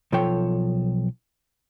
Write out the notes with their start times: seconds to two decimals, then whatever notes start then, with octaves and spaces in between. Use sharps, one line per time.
0.12 B1 F3 F4 A4 C#5 G5